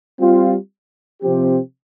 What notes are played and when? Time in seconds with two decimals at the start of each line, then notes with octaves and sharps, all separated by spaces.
0.19 G3 C4 F4
1.22 C3 F3 C4 G4